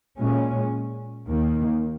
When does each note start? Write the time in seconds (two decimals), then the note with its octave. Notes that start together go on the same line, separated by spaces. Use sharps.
0.19 A#2 G#3 C#4
1.27 D#2 D#3 A#3